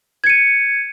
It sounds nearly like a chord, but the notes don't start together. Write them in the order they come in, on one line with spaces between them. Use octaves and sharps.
G#6 C#7 D#7